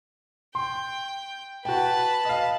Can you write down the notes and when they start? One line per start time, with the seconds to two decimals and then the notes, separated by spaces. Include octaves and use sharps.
0.55 G5 C6
1.65 F#4 B4 G5 A5
2.25 D#5 F5